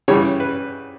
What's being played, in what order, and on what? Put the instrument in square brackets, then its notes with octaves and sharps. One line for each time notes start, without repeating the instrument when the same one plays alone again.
[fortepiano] C#3 E3 G3 C#5
B4